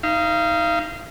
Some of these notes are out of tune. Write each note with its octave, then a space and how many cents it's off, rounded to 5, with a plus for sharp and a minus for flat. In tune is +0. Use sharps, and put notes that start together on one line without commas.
D#4 +15 F5 -25